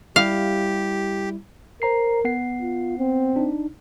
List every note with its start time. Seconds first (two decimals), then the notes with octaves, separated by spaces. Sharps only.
0.16 G3 E4 G4 F5
1.82 A#4 C5 A#5 C7
2.25 B3 F#5 C7
2.62 F4
2.99 C4
3.36 D4 D#4